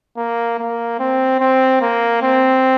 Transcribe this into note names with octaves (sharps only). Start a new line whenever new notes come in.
A#3
A#3
C4
C4
A#3
C4